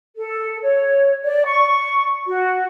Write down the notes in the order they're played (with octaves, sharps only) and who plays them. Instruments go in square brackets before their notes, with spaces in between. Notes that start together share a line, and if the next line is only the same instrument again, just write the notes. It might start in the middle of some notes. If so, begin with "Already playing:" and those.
[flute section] A4
C#5
D5
C#6
F#4